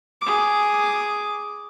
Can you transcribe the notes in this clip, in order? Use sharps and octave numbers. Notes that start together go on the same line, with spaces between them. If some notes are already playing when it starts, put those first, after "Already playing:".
G#4 D6